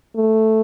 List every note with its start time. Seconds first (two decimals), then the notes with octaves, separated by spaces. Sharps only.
0.16 A3